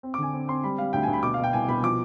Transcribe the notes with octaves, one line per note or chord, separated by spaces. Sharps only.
C4
D6
D3 G#5
C4
C4 C6
G3 B5
G3 F5
D2 G5
G#5
D2
B5
B2 D6
F5
B2 G5
C2 G#5
B2 B5
F3 D6